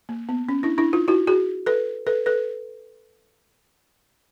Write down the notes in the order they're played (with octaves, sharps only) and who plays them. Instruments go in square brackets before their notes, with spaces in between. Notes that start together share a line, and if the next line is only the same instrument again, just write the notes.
[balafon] A#3
B3
C#4
D4 E4
D4 E4
D#4 F4
E4 F#4
F#4 G#4
A4 B4
A4 B4
A4 B4